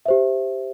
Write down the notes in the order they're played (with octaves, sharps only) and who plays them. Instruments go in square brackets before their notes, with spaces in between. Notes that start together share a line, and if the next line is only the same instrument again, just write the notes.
[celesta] G4 C5 E5